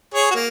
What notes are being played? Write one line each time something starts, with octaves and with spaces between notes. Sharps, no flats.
G#4 C#5
F#4
A#3